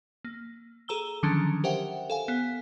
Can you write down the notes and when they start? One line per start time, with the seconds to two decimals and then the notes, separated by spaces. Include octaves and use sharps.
0.24 A#3
0.88 G#4 A4 A#5 E6 G7
1.23 D3 D#3 F3 F#3 C#4 D4
1.64 G4 A#4 C5 E5 F#5 G5
2.10 A4 F5 G#5
2.28 B3